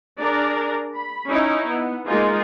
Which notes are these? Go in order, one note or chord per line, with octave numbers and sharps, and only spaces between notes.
D4 G#4 A#4 D5 A#5
B5
C#4 D#4 E4
B3
G#3 A#3 D#4 F4 G#4